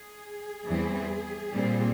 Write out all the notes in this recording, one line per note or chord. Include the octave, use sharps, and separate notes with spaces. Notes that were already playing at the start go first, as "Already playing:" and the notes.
Already playing: G#4
E2 E3 G3 C4
A#2 G3 C4